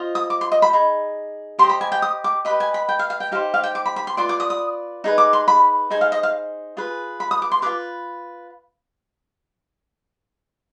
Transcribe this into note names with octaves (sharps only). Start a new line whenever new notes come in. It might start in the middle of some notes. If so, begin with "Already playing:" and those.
Already playing: F4 C5 D#5
D#6
D6
C6
D#5
B5
D#4 G#4
G4 C5 D#5 C6
B5
G#5
G5
D#6
D6
G4 B4 D#5 B5
G#5
B5
G5
F5
F5
G5
D#4 G4 C5 F5
F5
G5
D6
B5
B5
C6
F4 B4 D5 C6
D6
D#6
D#6
D#4 G#4 B4
D6
C6
B5
D#4 G#4 C5 G#5
F5
D#5
F5
F4 G#4 B4
B5
D#6
D6
C6
F4 G#4 B4 D6